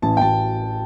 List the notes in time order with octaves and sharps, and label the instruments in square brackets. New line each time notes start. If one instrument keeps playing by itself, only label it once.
[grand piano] A1 A5
G5
A1 A5